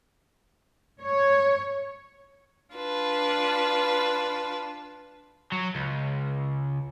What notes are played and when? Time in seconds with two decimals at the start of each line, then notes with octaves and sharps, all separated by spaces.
1.01 C#5
2.74 D4 F4 B4 A5
5.52 F#3
5.75 C#2